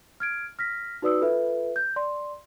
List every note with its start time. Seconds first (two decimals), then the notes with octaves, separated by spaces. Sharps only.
0.20 F6 G#6 D7
0.59 F6 A#6 B6
1.02 D#4 F#4 B4 D5 D#6 E6
1.21 F4 A4 B4 E5
1.76 G6
1.96 D5 C6